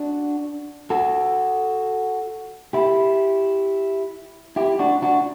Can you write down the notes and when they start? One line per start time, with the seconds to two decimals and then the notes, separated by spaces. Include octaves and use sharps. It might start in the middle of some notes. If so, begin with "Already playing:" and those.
Already playing: D4 F#4
0.90 F#4 A4
2.73 E4 G4
4.56 E4 G4
4.79 D4 F#4
5.02 D4 F#4